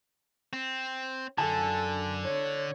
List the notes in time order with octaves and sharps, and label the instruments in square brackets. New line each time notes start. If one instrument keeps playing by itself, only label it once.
[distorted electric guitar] C4
[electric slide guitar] F#2 G#5 A5 [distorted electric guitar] D3 [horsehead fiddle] A4
[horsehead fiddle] C#5